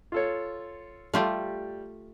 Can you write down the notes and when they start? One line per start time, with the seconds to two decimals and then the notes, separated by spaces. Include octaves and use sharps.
0.12 F4 A4 C#5
1.14 G3 A3 F4 G4